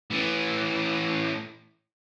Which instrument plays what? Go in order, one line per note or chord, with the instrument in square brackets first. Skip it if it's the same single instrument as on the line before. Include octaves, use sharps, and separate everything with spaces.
[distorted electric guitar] A2 E3